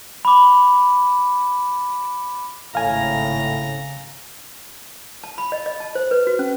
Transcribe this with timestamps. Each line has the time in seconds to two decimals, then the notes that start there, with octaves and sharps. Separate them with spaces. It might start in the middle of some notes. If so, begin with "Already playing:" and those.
0.25 B5 D6
2.75 G#1 A2 C#3 F5 G#5 A#5
5.24 A5
5.38 B5
5.52 D#5
5.66 D#5
5.80 A5
5.95 C5
6.11 B4
6.27 F#4
6.39 C#4